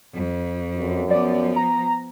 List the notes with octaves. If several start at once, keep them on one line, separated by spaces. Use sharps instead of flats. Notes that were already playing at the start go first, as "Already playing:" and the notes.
F2
F#2
F3 B3 D5
A#5